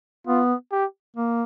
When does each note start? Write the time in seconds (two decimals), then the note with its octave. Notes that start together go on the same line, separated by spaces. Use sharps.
0.27 B3 F4
0.72 G4
1.17 A#3